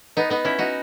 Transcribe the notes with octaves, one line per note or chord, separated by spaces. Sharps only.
B3 D#4
B3 D#4
C#4 E4
D#4 F#4